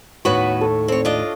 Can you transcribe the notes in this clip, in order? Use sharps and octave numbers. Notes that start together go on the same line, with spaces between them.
D#2 A2 B3 F#4 B4 C#5
A4
C4 C#5
D4 F4 D#5